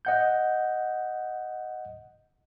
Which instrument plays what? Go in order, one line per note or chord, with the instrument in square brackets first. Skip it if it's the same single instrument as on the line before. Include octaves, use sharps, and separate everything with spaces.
[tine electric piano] D#5 F#5 G6